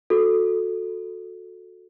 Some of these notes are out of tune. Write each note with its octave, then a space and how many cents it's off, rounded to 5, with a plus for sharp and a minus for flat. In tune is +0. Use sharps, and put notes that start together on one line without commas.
F#4 -25 A4 +0